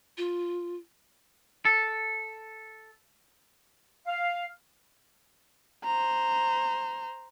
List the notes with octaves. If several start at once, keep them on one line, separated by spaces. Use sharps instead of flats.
F4
A4
F5
C5 A#5